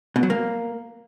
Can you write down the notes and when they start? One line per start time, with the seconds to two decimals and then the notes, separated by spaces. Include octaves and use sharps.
0.16 B2
0.23 F#3
0.30 A#3